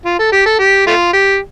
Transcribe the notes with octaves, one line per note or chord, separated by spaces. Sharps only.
F4
A4
G4
A4
G4
A3 F4
G4